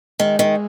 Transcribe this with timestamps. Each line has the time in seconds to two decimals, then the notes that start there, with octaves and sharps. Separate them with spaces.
0.19 D#3 G#3
0.39 D#3